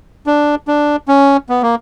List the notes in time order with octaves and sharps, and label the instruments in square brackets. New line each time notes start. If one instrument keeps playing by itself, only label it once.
[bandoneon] D4
D4
C#4
B3
A#3